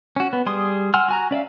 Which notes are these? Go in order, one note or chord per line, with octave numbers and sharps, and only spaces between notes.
C#4 F#4
B3
G3 G#4 C6 D#6
F#5 G#5 C6 E6 F6
F#4 G#5 A#5
C#4 D5 E5 F5